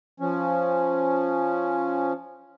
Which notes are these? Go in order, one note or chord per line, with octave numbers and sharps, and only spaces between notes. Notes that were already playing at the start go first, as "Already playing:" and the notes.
F3 C#4